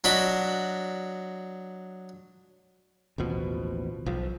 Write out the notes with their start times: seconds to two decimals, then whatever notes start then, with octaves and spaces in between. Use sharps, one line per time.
0.04 F#3 D4 D#5 B5
3.18 A1 D#2 B2 F3
4.06 B1 F3